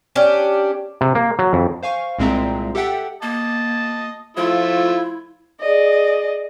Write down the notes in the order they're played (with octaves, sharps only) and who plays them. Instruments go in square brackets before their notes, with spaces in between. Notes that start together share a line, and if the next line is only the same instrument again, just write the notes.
[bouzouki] C#4 D4 G4
[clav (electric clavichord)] C3
A#3
F#3
F2
[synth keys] C5 F5 G#5 C#6
C2 A#2 G#3 C4 E5 A#5
G4 A4 E5 F#5 G5
[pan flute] A#3 [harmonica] D#5 A5
[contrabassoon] F3 [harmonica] A3 F4 E5 [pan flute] E4
[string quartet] G#4 D5 D#5